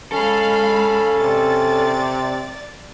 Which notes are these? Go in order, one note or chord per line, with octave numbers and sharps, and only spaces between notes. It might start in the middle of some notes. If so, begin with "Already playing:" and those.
G#3 C#4 A4 F5 B5
C3 D5 A6